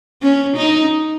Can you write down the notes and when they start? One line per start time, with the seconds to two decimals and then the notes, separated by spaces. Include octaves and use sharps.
0.22 C#4
0.57 D#4